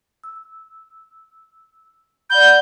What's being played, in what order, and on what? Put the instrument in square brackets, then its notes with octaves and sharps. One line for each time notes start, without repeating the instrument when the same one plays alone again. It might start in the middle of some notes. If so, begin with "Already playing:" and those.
[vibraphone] E6
[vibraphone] D5 F#5 B5 [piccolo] G6